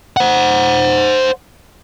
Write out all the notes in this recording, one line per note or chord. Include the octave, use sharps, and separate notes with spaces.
C5 F#5